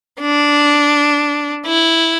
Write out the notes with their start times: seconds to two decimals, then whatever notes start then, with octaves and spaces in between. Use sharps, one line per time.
0.21 D4
1.67 E4